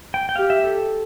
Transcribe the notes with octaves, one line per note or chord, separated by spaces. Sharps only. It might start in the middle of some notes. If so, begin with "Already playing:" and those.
G5
G5
G4 F5
E5
A4